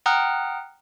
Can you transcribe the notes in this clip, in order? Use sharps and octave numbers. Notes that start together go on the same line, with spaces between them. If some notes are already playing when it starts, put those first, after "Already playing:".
F#5 G5 A#5 D#6 F6 F#6